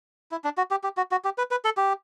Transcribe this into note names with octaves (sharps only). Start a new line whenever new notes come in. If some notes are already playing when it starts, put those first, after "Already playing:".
E4
D4
F#4
G4
G4
F#4
F#4
G4
B4
B4
A4
G4